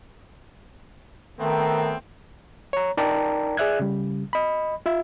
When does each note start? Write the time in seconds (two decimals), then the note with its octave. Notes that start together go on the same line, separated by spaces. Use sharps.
1.38 D#3 A3 B3 C4
2.73 C#5 A#5
2.97 D#4 A#4 D5 G5 A5 A#5
3.57 G#4 D5 E5 F#6 G#6
3.79 C#3 G3
4.33 D#5 B5
4.86 F4 E5